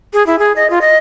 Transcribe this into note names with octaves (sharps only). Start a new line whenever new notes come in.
G#4
E4
G#4
D#5
F4
D#5